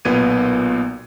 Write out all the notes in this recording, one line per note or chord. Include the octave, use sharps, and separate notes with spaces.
B1 A#2 B3 G#6 D#7